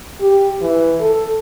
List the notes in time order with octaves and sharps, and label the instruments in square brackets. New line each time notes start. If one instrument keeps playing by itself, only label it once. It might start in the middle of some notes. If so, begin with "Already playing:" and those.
[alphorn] G4
E3
A4